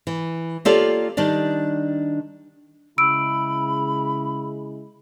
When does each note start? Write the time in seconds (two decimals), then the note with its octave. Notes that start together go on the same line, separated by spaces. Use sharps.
0.07 E3
0.65 A#3 F4 G4 A4 C#5 D5
1.17 D#3 G3 D4 D5
2.98 C#3 G#3 E4 B5 E6 D7